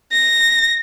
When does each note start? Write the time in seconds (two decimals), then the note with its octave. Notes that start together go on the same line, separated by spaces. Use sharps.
0.12 A#6